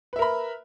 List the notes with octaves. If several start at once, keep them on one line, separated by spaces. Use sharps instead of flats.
A#4 B4 E5 B5